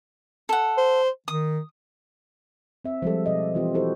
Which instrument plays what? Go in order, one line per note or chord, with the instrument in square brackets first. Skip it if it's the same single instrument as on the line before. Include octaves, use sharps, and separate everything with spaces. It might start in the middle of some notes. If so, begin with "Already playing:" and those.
[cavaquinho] A4 F#5
[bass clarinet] C5
[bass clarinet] D#3 [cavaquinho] D#6
[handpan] C4 E5
F3 G3 G#3 A4
B2 D5 D#5
E3 C4 F4 G4 A#4
E4 F#4 G4 A4 C5